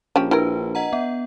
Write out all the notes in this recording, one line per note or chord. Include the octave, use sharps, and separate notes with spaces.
A#1 F3 C#4 G4
D4 E4 G4 A#4 B4
D#5 F#5 A#5
B3